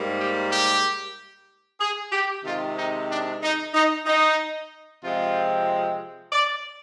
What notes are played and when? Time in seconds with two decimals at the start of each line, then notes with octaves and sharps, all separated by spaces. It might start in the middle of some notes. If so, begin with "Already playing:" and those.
Already playing: G#2 G3 A#3
0.18 G4
0.51 G4
1.81 G#4
2.12 G4
2.44 C3 D#3 G#3 C4 F4
2.77 D#4
3.10 D4
3.42 D#4
3.74 D#4
4.06 D#4
5.03 C3 F3 G#3 C4 F4
6.32 D5